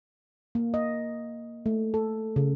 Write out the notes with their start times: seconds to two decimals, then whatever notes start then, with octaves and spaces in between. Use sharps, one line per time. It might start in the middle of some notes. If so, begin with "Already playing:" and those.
0.55 A#3
0.74 D#5
1.66 A3
1.94 A4
2.36 C#3